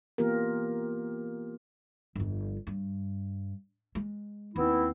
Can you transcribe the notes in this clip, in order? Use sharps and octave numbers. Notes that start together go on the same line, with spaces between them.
E3 A#3 B3 F4 G4 A#4
G1 F2
G2
G#3
D#2 B3 C4 E4